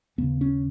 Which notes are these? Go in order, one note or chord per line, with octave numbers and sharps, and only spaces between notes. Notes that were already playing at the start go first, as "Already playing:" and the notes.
D#2 C#3 B3
C#4